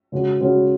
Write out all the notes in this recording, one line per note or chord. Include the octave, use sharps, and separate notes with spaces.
C#3 G#3 C#4 F#4
C#3 G#3 C#4 F#4